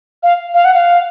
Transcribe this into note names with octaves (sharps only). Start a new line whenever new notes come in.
F5
F5
F#5
F5